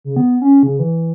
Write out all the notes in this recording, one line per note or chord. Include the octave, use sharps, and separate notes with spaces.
C#3
B3
C#4
C#3
E3